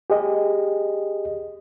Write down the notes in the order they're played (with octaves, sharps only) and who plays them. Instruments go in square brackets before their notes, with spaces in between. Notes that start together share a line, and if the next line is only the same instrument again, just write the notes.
[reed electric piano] G4 G#4 D#5